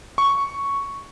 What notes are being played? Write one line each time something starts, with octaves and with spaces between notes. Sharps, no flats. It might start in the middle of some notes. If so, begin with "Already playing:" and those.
C#6